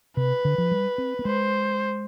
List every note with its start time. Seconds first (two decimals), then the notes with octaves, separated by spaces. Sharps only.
0.17 C3 B4
0.45 D3
0.58 F3
0.71 G3
0.98 C4
1.19 B3
1.25 G#3 C5